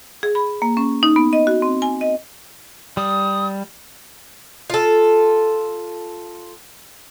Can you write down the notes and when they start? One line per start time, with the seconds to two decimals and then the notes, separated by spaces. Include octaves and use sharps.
0.23 G#4
0.35 B5
0.62 A#3
0.77 C#4
1.03 D#4
1.16 B3
1.33 D#5
1.47 F#4
1.62 C4
1.82 G#5
2.01 D#5
2.97 G3 D#6
4.70 F4 A4